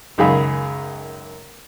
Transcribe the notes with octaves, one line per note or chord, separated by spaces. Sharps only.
C#2 F#2 D#3 G#4 F5 B5